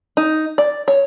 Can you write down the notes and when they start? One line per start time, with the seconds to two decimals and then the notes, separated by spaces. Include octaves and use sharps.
0.17 D#4
0.58 D5
0.88 C#5